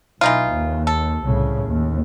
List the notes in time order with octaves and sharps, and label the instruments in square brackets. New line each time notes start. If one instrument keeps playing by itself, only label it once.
[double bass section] B1 [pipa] E3 D#4 F4
[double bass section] D#2
[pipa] A4
[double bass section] C2 A2 C#3
D#2